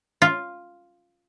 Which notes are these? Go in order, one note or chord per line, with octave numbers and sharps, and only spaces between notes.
F4